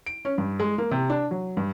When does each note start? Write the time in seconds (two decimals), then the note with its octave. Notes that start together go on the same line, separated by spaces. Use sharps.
0.06 D7
0.25 C#4
0.38 G2
0.60 G#3
0.78 A#3
0.91 C3
1.10 D4
1.31 F#3
1.57 G2